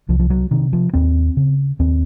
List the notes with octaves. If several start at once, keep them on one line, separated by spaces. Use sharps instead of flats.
C2 F3
F3
F#3
C3 D#3
F3
D#2 C4
C#3
D#2 C4